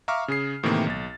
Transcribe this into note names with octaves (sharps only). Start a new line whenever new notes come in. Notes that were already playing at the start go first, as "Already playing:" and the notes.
E5 F5 A#5 C#6 D6 F6
C#3 G#4 C7
A2 C3 D#3 E3 A#3
B1 A6